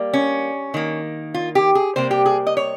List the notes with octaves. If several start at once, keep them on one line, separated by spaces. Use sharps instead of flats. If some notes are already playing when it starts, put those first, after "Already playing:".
Already playing: G3 A#3
C#4
D#3 A#3
F4
G4
G#4
C3 G3 A#3 C5
G4
G#4
D#5
C#5